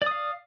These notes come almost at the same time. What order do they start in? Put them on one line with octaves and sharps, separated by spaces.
D5 D#6 F5